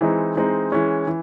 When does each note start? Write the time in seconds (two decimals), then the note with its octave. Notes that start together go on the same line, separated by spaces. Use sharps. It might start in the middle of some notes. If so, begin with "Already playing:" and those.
0.01 E3 G#3 C4 D#4
0.36 E3 G#3 C4 D#4
0.72 E3 G#3 C#4
1.07 E3